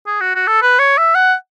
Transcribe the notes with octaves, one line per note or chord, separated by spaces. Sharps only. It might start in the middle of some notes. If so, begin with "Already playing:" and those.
G#4
F#4
F#4
A4
B4
C#5
E5
F#5